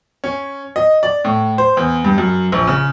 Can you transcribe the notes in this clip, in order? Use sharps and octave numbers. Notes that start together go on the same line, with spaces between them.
C#4
D#5
D5
A2
C5
E2
G2
F#2
A#1
C#3